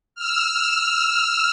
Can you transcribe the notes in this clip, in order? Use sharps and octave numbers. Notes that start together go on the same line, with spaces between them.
E6 F6